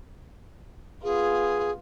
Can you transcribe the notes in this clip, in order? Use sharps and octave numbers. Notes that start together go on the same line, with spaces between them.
B3 F4 G#4